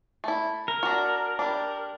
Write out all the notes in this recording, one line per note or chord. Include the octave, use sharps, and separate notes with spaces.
A3 E4
A#4
D4 F#4
G3 D4